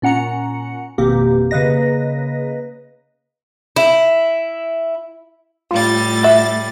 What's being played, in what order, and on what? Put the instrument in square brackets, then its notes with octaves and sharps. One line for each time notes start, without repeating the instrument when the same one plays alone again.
[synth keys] A#2 C#4 F#5 A#5 C#7
G#1 F2 B2 A#3 G4
C#3 A#3 B4 D#5 A#6
[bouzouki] E4
[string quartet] A2 G3 A6 [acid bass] F4
[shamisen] F#4 E5